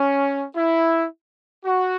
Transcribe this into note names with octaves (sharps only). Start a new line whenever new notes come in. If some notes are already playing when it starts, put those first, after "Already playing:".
Already playing: C#4
E4
F#4